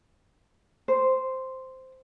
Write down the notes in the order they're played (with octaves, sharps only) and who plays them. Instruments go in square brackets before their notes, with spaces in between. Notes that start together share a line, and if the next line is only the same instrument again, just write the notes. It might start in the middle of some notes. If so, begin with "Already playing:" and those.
[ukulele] C5